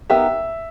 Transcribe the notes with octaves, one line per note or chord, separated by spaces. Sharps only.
B3 D#4 G4 A#4 E5